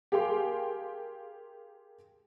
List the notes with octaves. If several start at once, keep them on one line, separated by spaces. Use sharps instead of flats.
G4 G#4 A#4 F5 G5 C6